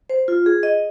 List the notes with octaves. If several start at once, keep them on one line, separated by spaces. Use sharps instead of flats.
C5
F4
G#4
D#5